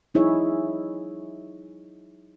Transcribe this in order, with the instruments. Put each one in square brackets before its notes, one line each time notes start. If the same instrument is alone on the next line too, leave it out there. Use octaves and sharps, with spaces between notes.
[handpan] F#3 D#4 E4 G#4 C#5 E5